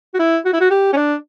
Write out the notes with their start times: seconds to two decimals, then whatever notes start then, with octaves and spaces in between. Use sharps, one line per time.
0.14 F#4
0.19 E4
0.45 F#4
0.53 E4
0.60 F#4
0.71 G4
0.93 C#4
0.96 D4